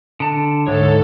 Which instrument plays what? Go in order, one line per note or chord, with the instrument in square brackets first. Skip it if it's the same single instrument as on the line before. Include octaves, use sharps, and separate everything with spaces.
[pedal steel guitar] D3 A5
[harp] D2 D6 [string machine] G#2 A4 [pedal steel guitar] C#5